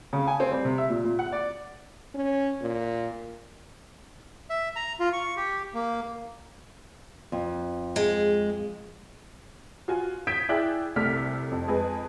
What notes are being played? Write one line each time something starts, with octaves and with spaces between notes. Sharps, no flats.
C#3
G#5
C4
G3
C3
E5
A#2
A#2
F#5
D5
C#4
A#2
E5
A#5
F4
C#6
G4
A#3
F2
G#3
F4 F#4 G#5
D#6 G6 G#6 B6 D7 E7
E4 G#4 D5 G5 F#6
C2 C3 A3 D5 F6 B6
F2
F2 G#3 G#4 B4